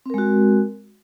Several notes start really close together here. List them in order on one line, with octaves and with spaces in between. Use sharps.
C4 A#4 G#3 F#4